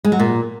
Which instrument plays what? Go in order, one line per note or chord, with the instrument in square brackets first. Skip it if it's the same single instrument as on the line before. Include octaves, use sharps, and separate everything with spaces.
[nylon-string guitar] G#3
F#3
A#2